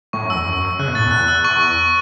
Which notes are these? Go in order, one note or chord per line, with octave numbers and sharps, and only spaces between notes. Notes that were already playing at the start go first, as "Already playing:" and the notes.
A2 C#6
F#2
E6
E2
F#2
F#2
C#3 F#6
B2
A2 A6
E2
F#6
E6
C#6